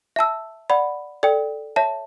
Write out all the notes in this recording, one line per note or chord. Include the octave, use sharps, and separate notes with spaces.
E5 A5 E6
D5 F#5 B5
A4 D5 G5
C#5 E5 A5